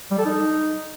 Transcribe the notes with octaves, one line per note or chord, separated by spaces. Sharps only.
G3
A4
D#4